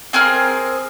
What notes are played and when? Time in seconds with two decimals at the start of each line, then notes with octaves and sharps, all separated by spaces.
0.13 C4 G#4 A#4 F6